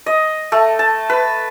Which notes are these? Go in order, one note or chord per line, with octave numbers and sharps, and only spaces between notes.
D#5
A3
A5
B4